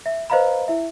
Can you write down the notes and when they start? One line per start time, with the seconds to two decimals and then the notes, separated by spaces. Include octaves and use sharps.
0.06 E5
0.30 B4 C5 D#5 F5 A#5 B5
0.68 E4 E5